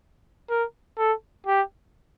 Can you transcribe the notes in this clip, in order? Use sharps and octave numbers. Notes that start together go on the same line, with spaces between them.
A#4
A4
G4